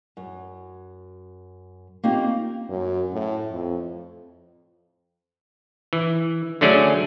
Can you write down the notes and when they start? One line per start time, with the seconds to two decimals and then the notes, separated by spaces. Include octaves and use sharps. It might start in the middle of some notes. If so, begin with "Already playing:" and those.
0.17 F#2
2.04 A#3 C4 C#4 D#4 F4 G4
2.69 F#2
3.13 A2
3.51 F2
5.93 E3
6.61 D3 F#3 A3 C#4 G#4 D5